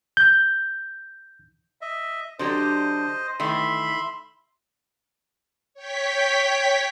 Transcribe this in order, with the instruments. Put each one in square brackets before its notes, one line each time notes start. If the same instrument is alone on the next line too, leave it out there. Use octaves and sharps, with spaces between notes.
[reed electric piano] G6
[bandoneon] D#5 E5
[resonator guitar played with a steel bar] D3 F#3 G4 [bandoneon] C5 D#5
[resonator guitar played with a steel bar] D#3 E3 A3 [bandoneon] E5 B5 C6
[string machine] C#5 G5 B6